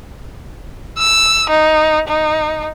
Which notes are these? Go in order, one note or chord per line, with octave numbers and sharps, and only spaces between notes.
E6
D#4
D#4